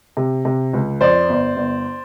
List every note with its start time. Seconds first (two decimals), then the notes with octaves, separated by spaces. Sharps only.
0.17 C3
0.45 C3
0.73 C#2
1.01 F2 C5 D5
1.29 G1
1.56 G1